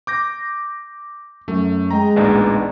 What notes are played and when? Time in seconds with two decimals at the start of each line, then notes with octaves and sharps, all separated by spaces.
0.07 D6 G6 A#6
1.48 F#2 A3
1.91 G#3 D#5 G5 A#5
2.16 A1 D2 A#2 B3 D4 D#4